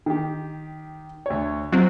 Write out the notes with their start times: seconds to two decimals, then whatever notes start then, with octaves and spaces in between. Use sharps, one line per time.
0.06 D#3 G4
1.26 D2 C#5
1.72 F#3 C4 F4 F#4